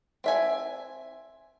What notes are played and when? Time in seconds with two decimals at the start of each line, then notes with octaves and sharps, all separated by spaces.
0.24 C4 E5 G#5